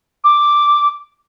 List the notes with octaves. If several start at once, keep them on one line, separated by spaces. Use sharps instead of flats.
D6